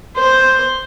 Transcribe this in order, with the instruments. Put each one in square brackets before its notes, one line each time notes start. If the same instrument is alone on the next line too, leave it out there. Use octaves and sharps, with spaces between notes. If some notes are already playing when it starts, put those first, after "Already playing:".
[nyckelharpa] C5